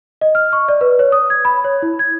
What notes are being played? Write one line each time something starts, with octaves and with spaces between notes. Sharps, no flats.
D#5
F6
C#6
D5
B4
C#5
D#6
G#6
B5
C#5
E4
G#6